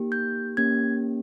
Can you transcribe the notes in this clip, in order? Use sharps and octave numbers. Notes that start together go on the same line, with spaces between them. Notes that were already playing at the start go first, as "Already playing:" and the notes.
Already playing: A#3 D#4 G4
G6
A#3 C#4 G4 G#6